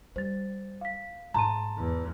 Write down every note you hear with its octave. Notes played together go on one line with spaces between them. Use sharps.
G3 C5 A6
F5 B6
G#2 A5 A#5 C6 D#7
E2